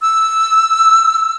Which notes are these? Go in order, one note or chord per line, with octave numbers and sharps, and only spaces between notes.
E6